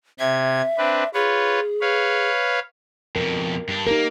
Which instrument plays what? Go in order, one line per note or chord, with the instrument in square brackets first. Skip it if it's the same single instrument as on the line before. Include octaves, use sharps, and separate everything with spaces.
[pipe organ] C3 G#6 [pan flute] E5
[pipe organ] C4 D4 B4
[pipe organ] F4 B4 C#5 [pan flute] G#4
[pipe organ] B4 C#5 F5
[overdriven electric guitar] F2 B2 [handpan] A#4
[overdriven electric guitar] G2 D4
[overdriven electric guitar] A#3 [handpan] D#4 G4 A#4